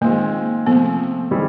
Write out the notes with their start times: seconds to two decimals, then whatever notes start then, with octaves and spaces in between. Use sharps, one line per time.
0.01 D#3 G#3 A#3 C4 F4 G#4
0.66 C3 F3 A3 B3 C4
1.31 D#3 G3 C4 E4 G#4